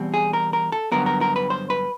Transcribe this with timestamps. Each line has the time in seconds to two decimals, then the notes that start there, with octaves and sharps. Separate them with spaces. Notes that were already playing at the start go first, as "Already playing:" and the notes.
Already playing: E2 B2 G3 C4
0.14 G#4
0.33 A#4
0.53 A#4
0.72 A4
0.92 G2 D3 F#3 B3 A#4
1.06 A#4
1.21 A#4
1.36 B4
1.50 C5
1.70 B4